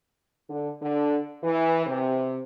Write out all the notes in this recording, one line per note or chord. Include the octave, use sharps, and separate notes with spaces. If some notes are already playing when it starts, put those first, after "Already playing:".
D3
D3
E3
C3